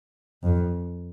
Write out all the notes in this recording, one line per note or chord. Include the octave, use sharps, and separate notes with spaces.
F2